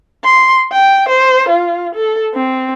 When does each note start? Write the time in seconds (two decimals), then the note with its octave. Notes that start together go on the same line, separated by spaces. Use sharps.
0.24 C6
0.72 G5
1.09 C5
1.49 F4
1.95 A4
2.35 C4